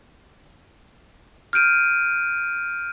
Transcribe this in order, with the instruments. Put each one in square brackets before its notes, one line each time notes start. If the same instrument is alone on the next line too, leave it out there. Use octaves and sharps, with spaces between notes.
[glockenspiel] F6 G6 D7 D#7